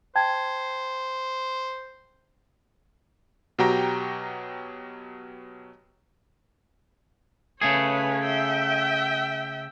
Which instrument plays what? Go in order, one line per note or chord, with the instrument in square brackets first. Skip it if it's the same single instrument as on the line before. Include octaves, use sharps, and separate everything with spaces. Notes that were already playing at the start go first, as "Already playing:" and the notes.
[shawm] C5 [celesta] G5 A5 G#6
[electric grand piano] B2 F#3 F#4 G4 G5 A#5
[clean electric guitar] C#3 A3 G#4 [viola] B4 C#5
[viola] E5 G5